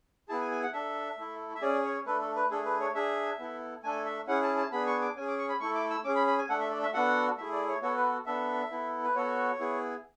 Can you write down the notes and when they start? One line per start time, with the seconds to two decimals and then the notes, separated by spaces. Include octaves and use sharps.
0.29 B3 E4 G#4 A5
0.40 G#5
0.51 G#5
0.63 F#5
0.73 D4 A4 E5
1.17 A3 E4 A4
1.55 E5
1.62 C#4 G#4 D5
1.84 C#5
2.06 A3 D4 A4 B4
2.21 A4
2.36 B4
2.51 A3 D4 G#4 A4
2.65 B4
2.80 C#5
2.95 D4 G#4 E5
3.39 B3 E4 A4
3.83 A3 D4 A4 G#5
4.05 E5
4.27 C#4 E4 G#4 F#5
4.43 A5
4.57 A5
4.72 B3 D4 G#4 B5
4.87 C#6
5.01 D6
5.16 C#4 G#5
5.21 G#4
5.28 D6
5.38 C#6
5.49 B5
5.60 A3 E4 A4 C#6
5.75 D6
5.90 E6
6.04 C#4 G#4 D6
6.16 B5
6.27 B5
6.38 G#5
6.49 A3 D4 A4 F#5
6.60 E5
6.71 D5
6.83 E5
6.93 B3 D4 F#4 A4 F#5
7.37 A3 E4 G#4 E5
7.53 D5
7.68 C#5
7.82 B3 F#4 A4 C#5
7.97 B4
8.26 B3 D4 A4 E5
8.71 B3 E4 A4
9.03 B4
9.15 B3 F#4 A4 C#5
9.59 B3 E4 G#4